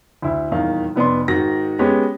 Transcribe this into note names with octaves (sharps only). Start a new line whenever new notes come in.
D2 E4
D#1 E2 D#3 F5
F1 B3 D5 C6
G#2 D#3 F#4 A#6
G#3 B3 C#4 G4